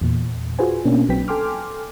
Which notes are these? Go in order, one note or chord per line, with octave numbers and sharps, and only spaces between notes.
E2 A#2
F4 F#4 G#4 B4 C5 G#5
B2 A#3 C#4 D4
B1 F#3 C4 B4 G5 B6
A4 G5 G#5 C6 D6 F6